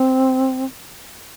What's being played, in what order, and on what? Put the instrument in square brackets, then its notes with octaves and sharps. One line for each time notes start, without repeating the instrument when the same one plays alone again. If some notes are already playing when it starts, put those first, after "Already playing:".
Already playing: [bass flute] C4